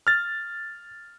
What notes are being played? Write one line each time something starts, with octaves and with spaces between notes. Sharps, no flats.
F6 A6